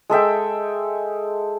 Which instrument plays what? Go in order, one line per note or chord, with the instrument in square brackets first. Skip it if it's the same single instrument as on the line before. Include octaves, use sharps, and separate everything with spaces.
[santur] G#3 A4 E5 G5